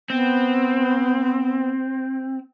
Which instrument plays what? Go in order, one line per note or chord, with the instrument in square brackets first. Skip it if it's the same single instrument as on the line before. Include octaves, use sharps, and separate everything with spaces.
[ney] B3 [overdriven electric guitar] C4